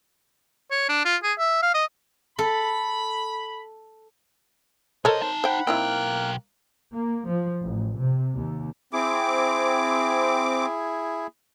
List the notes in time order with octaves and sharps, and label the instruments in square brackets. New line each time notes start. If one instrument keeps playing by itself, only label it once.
[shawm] C#5
D4
F4
G#4
E5
F5
D#5
[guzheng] A4 [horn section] B5
[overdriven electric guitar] B1 D#5 [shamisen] A4 A#4 C#5 [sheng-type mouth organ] C5
[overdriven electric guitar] D#4 A5
[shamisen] C5 G5 [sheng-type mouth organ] F#5 B5
[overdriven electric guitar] B1 G5 [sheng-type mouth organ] A#3 F6 F#6 [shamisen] C4 D#4 E4
[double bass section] A#3
F3
A1
C3
D#2
[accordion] C4 D6 [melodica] E4 G#4